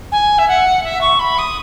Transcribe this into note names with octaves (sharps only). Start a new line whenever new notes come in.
G#5
E5
F#5
E5
C#6
B5
D#6